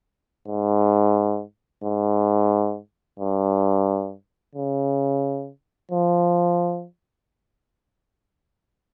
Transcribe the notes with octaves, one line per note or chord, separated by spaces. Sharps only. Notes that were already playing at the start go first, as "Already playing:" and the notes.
G#2
G#2
G2
C#3
F3